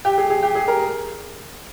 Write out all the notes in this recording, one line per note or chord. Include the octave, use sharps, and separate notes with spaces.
G4
G#4
G#4
G4
G#4
A#4